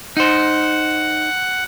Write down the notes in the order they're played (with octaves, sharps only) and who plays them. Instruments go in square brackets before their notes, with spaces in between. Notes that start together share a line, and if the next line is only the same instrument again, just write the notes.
[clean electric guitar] D#4 C5 [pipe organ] F#5